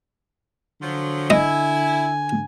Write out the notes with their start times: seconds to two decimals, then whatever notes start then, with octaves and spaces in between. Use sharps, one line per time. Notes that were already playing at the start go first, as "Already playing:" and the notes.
0.81 D3 F3 F#3
1.30 E4 D#5 G#5